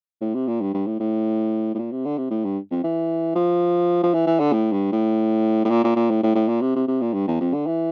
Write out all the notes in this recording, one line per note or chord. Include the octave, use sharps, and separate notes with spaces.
A2
C3
A#2
G2
G2
A2
A2
A2
A#2
C3
D3
C3
A2
G2
F2
E3
F3
F3
E3
E3
D3
A2
G2
A2
A2
A#2
A#2
A#2
A2
A2
A2
A#2
C3
C3
C3
A#2
G2
E2
F2
D3
E3